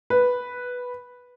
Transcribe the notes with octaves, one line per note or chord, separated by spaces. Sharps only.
B4